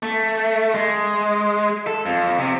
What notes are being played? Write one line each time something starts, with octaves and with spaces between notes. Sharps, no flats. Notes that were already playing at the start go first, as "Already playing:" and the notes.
A3
G#3
A4
F2
C3